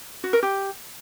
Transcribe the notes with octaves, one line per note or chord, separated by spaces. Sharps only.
F#4
A#4
G4